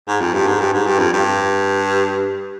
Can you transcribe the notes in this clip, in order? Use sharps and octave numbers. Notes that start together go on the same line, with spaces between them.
G#2
F2
G2
G#2
G2
G#2
G2
F2
G2